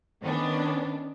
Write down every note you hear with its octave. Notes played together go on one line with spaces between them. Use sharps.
D#3 B3 C#4 D4